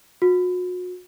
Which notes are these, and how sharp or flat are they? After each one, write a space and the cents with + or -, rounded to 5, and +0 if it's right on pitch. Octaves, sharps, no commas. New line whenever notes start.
F#4 -40